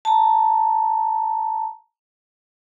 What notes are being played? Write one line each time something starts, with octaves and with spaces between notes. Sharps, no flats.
A5 A#5